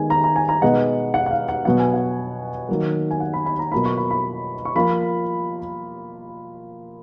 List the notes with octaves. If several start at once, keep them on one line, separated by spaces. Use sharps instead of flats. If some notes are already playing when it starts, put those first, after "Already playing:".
Already playing: D#3 G#3 B3 G#5
A#5
A#5
G#5
A#5
B2 G#3 B3 D#4 F#5
F#5
F#5
F5
F#5
B2 F#3 B3 F#5
G#5
F#5
D#3 F#3 A#3
G#5
F#5
B5
B5
A#5
B2 F#3 A#3 F4 B5
C#6
B5
B5
C#6
F3 A#3 F4 B5